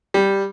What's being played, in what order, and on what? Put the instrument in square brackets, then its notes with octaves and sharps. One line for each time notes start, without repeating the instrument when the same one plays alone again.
[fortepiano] G3